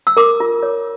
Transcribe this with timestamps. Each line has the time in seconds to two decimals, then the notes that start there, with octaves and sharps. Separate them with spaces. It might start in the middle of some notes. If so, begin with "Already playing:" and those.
0.07 E6
0.17 A#4 D6
0.40 F4
0.63 C#5